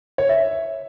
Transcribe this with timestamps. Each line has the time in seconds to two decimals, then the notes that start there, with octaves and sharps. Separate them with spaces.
0.18 C#5
0.29 E5